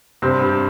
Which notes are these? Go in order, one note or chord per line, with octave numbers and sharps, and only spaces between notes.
G2 C3 C4
G2